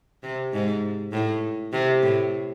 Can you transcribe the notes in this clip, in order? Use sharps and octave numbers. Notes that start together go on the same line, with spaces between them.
C3
G#2
A2
C3
A2